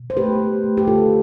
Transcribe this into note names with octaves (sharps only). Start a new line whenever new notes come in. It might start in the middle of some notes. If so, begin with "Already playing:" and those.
Already playing: B2
C5
A3 G4 B4
A3
A3
G4
D3 F4 A4